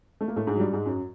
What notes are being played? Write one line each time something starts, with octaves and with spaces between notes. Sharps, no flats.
A3
A#3
A2 A3
G#2 G#3
F#3
G2 G3
G#2 G#3
F#2 F#3